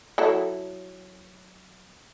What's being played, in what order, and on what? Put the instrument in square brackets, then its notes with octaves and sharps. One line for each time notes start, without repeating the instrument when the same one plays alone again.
[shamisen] F#3 E4 A4